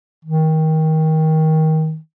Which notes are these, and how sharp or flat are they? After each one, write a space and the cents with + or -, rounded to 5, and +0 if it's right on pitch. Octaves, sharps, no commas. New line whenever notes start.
D#3 +20